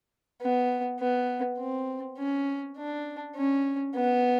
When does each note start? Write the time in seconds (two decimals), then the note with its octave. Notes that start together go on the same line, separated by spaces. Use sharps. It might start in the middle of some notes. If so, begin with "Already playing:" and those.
0.42 B3
1.00 B3
1.59 C4
2.19 C#4
2.77 D4
3.37 C#4
3.96 B3